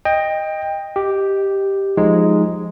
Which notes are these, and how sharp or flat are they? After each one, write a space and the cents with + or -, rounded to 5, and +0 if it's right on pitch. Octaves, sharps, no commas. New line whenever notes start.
D#5 +0 G5 +20
G4 +0 D#5 +0
F3 +5 G#3 +0 D#4 +0